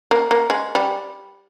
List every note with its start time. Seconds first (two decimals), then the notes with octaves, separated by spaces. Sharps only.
0.11 A#3
0.31 A#3
0.50 G#3
0.75 G3